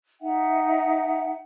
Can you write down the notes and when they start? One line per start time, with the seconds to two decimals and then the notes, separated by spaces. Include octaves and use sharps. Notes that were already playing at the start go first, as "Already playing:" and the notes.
0.20 D#4 E5 F#5 G5